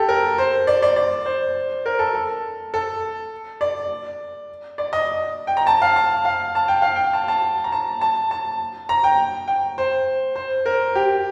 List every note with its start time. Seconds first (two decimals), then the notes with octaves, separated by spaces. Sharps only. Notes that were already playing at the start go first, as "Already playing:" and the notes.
Already playing: G4 A4
0.09 A#4
0.38 C5
0.67 D5
0.82 D5
0.96 D5
1.26 C5
1.86 A#4
1.99 A4
2.14 A4
2.74 A4
3.61 D5
4.78 D5
4.93 D#5
5.47 G5
5.57 A#5
5.67 A5
5.82 F5
5.96 A5
6.25 F5
6.55 A5
6.68 G5
6.82 F5
6.96 G5
7.13 A5
7.28 A5
7.64 A#5
7.72 A5
8.01 A5
8.31 A5
8.89 A#5
9.04 G5
9.48 G5
9.78 C5
10.36 C5
10.66 A#4
10.95 G4